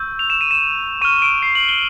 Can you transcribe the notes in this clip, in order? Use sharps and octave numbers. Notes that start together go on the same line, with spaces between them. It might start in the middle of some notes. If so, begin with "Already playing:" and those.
Already playing: C#6 E6 G6
F7
E7
D#7
E7
C#6 F6 D#7
D7
C7
F#7
G7